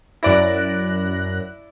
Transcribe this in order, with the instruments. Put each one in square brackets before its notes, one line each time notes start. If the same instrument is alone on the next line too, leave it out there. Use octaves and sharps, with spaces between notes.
[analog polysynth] F#2 F#6 A#6 [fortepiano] E4 D5